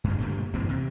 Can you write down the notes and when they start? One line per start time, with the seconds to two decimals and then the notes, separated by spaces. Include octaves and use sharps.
0.04 G2 B2
0.18 G2 A#2 D3 G3
0.54 G2 A#2 E3 C4
0.69 C3